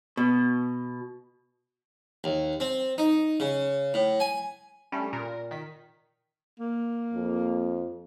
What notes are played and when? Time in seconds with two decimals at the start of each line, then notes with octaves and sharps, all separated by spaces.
0.17 B2
2.24 D#2
2.60 C4
2.98 D#4
3.40 C#3
3.94 A2
4.20 G#5
4.92 G3 A3 C#4
5.13 A#2 A#4
5.51 D#3 B6
6.59 A#3
7.14 F2